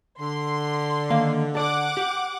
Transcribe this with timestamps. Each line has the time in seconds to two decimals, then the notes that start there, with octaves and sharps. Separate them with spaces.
0.20 D3 C6
1.10 D#3 A#3 F5
1.55 A4 D5 F#5 D6
1.97 G4